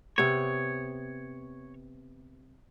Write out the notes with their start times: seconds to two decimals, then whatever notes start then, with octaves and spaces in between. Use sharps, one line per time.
0.18 C3 B3 C#5